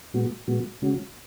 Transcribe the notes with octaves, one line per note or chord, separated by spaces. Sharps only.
A#2 G#3 B3 F#4
A#2 G#3 B3 F#4
C#3 G#3 C#4 F#4